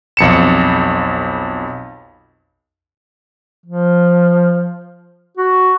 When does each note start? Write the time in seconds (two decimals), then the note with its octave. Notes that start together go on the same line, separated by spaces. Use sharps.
0.17 B1 F2 C#7 E7
3.66 F3
5.37 F#4